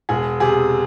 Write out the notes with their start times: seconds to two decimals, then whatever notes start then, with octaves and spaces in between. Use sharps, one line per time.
0.09 E1 G#4
0.40 C3 G#4